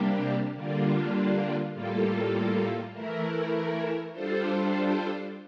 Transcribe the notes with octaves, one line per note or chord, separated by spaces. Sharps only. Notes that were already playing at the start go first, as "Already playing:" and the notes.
Already playing: C3 G3 A#3 D4 G4
D3 G3 A#3 D4 F4
A2 G3 A#3 F4 A4
E3 A3 E4 A#4
G3 D4 F4 A4 C5